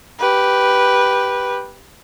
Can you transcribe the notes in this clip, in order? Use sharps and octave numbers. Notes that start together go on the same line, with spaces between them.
G4 B4